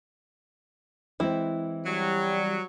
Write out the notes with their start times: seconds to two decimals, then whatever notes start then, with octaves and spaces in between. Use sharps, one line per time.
1.20 E3 G#3 C4 E4
1.86 F#3 G3